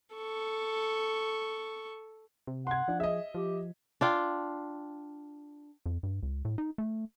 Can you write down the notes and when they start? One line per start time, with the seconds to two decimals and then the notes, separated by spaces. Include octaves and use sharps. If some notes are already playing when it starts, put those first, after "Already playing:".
0.15 A4 C#6
2.47 C3
2.67 F#5 C6 G#6
2.88 F3 D4
3.00 G#4 D#5 E5
3.35 F3 G4
4.01 D4 F4 G5
5.86 F2
6.03 G2
6.23 C#2
6.45 A2
6.58 D#4
6.78 A3